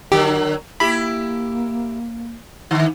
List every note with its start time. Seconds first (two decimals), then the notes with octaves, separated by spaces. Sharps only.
0.12 D3 F#3 G4 A#4
0.80 A#3 E4 G4 B5
2.71 D3 D#3